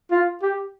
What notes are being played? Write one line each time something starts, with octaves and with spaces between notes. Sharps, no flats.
F4
G4